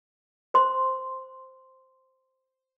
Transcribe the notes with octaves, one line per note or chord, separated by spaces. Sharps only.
C5 C6